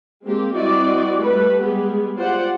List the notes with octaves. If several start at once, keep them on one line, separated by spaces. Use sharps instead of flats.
G#3 A#3 C4 G4
G3 C4 E4 F#4 D5 D#5
G3 A3 A4 B4
G3 G#3 B3 G4 G#4
F4 G4 C5 D5 F#5